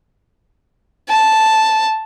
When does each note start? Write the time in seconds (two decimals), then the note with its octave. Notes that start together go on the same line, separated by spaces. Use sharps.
1.09 A5